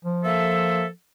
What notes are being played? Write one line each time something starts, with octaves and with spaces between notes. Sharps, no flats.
F3
A#3 A4 E5